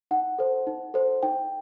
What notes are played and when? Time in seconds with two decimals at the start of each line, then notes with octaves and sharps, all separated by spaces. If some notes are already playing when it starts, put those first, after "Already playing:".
0.11 D#4 F#5
0.39 A4 C5
0.67 D#4
0.94 A4 C5
1.23 D#4 G5